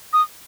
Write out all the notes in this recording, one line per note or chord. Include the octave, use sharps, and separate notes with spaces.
D#6